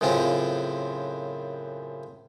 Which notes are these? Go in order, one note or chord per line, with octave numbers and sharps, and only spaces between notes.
F#2 A2 C#3 C4 F4